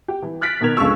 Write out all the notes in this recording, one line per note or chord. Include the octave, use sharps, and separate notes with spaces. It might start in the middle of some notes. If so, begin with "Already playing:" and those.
G4
E3
F6 F#6 A6 B6 D7
B2 D#3 A#4 G#6 F7
C#2 D3 F3 G#3 C#6 E6